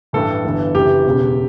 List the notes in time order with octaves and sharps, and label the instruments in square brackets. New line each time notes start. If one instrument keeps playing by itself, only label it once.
[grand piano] A1 G2 E3 A4
G1 G2 E3
F#1 F#2 E3 G4
E1 E2 C#3